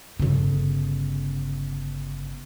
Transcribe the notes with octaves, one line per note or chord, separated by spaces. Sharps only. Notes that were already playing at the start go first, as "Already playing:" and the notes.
G1 C#3